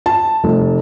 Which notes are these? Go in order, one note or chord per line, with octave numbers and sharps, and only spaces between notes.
A5
F1